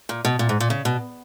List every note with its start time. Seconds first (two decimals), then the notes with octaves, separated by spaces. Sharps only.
0.09 A#2
0.25 B2
0.39 A#2
0.49 G#2
0.60 A#2
0.70 C#3
0.85 B2